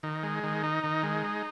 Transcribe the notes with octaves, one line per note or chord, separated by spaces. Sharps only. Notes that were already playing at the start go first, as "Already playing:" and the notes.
D#3
G#3
D#3
D#4
D#3
G#3
D#4